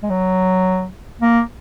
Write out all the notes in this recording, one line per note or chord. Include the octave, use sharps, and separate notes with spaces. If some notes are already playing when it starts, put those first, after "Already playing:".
G#3
F#3
A#3